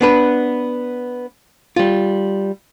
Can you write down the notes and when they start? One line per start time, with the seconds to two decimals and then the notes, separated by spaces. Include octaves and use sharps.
0.01 B3 D4 B4
1.76 G3 F4